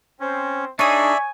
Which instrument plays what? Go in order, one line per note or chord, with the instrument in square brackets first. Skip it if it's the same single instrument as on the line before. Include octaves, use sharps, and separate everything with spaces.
[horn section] C4 C5 [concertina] C#4
[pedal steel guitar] D4 D#4 G#4 [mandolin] C#5 D#6 [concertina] D5 E5 [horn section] G#5